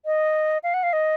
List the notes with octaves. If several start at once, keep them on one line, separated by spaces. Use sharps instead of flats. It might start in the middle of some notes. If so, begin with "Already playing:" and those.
D#5
F5
F#5
F5
D#5